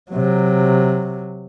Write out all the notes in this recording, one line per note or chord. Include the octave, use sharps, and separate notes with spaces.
C3 F#3